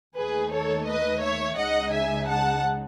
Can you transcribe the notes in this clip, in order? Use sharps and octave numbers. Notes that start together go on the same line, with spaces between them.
D#2 D#3 A3 D#4 G#4 B4
A4 C#5
B4 D#5
C#5 E5
C#2 C#3 G#3 D#4 D#5 F#5
E5 G#5
F#5 A5